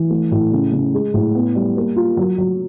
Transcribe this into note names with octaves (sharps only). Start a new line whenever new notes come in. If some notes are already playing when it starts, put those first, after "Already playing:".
Already playing: E3
A3
A2
C#3
C#3
G#3
A2
B3
G3
A#3
F4
F#3
F#3